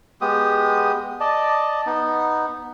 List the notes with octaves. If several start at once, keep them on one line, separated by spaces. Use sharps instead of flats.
G#3 B3 G4 D#6
D5 D#5 A5
B3 D#4